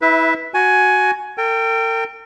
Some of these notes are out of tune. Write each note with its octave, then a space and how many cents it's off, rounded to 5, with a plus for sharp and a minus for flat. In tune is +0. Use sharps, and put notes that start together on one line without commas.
E4 -25 B4 +0 E5 +0
F#4 +0 G#5 +15
A#4 -45 G5 +0